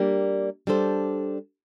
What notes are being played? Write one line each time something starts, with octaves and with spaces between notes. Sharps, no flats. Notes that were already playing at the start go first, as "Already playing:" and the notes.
Already playing: G3 A#3 D4 G4 D5
G3 D4 A4 C5